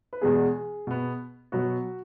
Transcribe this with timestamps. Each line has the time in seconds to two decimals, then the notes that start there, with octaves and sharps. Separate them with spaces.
0.13 B4
0.21 E2 B2 G#3 B3 G#4
0.87 B2 B3
1.52 B2 F#3 B3 F#4